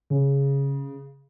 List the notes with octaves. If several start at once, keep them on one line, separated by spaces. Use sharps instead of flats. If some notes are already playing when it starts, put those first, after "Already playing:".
C#3